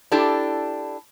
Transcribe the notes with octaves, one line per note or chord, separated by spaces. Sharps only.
D4 E4 G4 A4